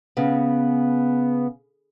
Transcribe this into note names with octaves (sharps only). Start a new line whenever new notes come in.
C#3 B3